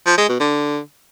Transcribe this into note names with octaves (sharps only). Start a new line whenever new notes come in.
F3
G#3
B2
D3